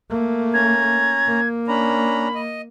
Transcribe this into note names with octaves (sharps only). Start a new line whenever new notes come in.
A3 A#3
C#4 A#5 G#6
A#3
C#4 D4 A#5 B5
D#5